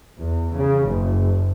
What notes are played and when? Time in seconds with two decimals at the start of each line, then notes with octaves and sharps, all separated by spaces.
0.20 E2
0.58 C#3
0.89 F#1